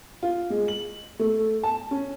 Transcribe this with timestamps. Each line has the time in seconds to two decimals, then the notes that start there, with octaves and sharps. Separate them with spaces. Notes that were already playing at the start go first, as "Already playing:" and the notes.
0.23 F4
0.50 G#3
0.68 F#7
1.19 A3
1.63 A5
1.91 C#4